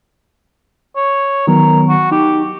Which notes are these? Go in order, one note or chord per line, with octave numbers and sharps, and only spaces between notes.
C#5
D#3 F#3 B3 A#4
F#4
D#4 G4